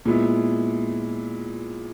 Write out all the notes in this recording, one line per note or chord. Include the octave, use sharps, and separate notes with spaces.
A#2 G#3 B3 E4